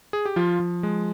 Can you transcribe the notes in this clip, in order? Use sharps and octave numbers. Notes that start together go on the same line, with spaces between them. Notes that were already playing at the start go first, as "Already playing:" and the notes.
G#4
G4
F3 F4
F3
G#3